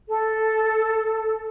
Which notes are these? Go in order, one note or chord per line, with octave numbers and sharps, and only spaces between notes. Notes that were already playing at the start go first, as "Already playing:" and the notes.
A4